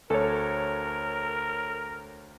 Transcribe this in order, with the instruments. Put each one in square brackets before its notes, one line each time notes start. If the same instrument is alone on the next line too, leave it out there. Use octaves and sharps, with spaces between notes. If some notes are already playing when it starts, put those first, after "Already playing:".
[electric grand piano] D2 C#5 [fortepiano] A4 [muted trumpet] A#4